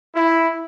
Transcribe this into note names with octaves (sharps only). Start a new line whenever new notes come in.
E4